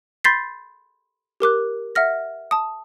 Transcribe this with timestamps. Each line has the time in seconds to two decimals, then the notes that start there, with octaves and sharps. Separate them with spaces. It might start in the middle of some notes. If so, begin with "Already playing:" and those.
0.24 B5 C6 G6 A6 B6 C7
1.40 G4 A#4 D6 F#6
1.95 E5 F#5 F6 A#6
2.51 A5 D#6